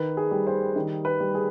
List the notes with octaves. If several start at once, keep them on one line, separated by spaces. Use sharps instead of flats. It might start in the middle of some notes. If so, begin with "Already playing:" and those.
Already playing: D#3 B4
G#4
G3
C5
D#3
B4
G3
G#4